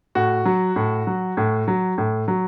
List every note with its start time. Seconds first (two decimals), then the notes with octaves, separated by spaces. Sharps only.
0.15 A2 F#4
0.45 F#3
0.76 A2
1.07 F#3
1.37 A2
1.68 F#3
1.98 A2
2.28 F#3